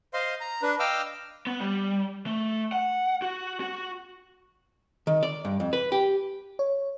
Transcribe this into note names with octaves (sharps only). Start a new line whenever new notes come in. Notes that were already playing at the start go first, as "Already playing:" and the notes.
C5 D#5 F5 C6
A#5
D4 B4
D#5 F5 G5 D6 E6 F6
B3
G3
A3
F#5
F#4
F#4
D#3
D5
G2
F2
B4
G4
C#5